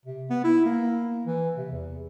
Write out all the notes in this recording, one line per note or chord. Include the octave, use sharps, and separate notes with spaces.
C3
B3
E4
A#3
E3
C3
E2